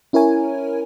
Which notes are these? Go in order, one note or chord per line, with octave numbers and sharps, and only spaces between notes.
C#4 E4 A#4 C#5 G#5